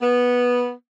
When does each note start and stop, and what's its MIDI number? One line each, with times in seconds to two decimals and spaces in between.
0.01 0.72 59